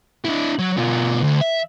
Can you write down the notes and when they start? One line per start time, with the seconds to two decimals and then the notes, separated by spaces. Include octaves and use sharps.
0.25 D4 E4
0.59 F#3
0.77 B2 F4
1.23 D2
1.41 E5